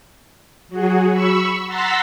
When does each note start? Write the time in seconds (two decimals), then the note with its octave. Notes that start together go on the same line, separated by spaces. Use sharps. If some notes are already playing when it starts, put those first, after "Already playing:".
0.68 F#3 F#4 G#4
1.10 B5 C#6 E6
1.66 F#5 A#5 C6 E6 A6 B6